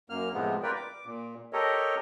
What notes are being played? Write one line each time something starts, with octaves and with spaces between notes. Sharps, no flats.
F#2 A#3 F6
A2 C3 F3 G#3 B3
F4 A#4 B4 D5 G5
D6
A#2
G4 A4 A#4 C#5 D#5